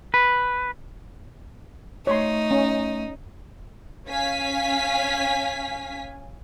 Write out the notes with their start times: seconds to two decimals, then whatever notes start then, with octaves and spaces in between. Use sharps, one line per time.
0.14 B4
2.07 A3 D#4 C#5 C6
2.51 C#4
4.08 C#4 F5 G#5 B6